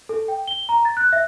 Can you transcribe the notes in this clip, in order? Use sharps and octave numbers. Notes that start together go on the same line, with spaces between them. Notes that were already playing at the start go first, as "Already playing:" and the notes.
A4
G5
G7
A#5
A6
F#6
E5